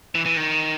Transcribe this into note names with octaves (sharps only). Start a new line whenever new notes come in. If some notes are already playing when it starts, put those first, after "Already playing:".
E3
E3
D#3